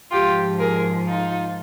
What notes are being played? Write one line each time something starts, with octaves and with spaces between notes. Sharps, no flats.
G#2 F3 F4 G4
G#4 A#4
D#4 F4